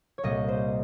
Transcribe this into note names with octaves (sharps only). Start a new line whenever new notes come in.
C#5
C2 A#2 G3 A#3 D#5
C5